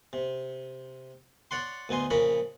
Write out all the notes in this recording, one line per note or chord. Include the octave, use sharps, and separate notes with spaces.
C3
C#5 D5 F#5 C6
D2 B3 D#4 G#5 C6
A#1 C#3 G#4 A#4 C#5 B5